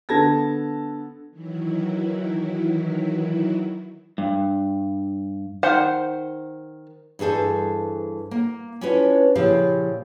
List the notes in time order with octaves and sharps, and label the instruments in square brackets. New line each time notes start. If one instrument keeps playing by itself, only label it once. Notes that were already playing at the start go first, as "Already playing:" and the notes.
[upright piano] D3 B3 A4 A5 G#6 A#6
[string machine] D#3 E3 F#3 E4
[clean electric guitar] G2
[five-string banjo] D#3 C5 F#5
[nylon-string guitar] G2 E3 G#4 A4 C5
A#3
C#4 D4 E4 F4 B4 C#5
A#2 C#3 F3 E4 G4 F5